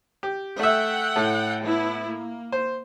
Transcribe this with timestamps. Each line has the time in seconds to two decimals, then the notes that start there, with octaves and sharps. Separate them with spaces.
0.23 G4
0.59 A3 E5 F#5 G5
1.16 A2 A4
1.62 B3 E4
2.08 A#3
2.52 C5